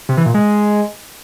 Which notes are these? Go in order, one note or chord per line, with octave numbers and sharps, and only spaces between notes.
C3
E3
A#2
G#3